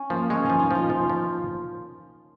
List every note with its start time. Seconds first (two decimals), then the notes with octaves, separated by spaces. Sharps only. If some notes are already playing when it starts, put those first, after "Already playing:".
Already playing: C#4
0.10 F3 A#3
0.30 G#3 C#4
0.45 F3 D#4
0.59 D#4
0.71 F3 F4
0.90 F3
1.10 F3